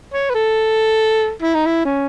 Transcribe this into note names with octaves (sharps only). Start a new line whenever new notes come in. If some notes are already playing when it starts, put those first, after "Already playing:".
C#5
B4
A4
E4
D#4
E4
C#4